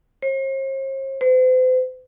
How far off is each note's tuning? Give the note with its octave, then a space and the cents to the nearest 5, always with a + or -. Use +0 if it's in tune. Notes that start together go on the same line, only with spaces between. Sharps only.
C5 +45
C5 -40